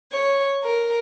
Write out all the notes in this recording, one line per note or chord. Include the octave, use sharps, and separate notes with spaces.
C#5
A#4